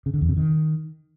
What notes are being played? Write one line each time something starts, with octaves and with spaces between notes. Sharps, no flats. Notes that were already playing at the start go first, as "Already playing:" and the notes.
C#3
D3
E2
C3
D#3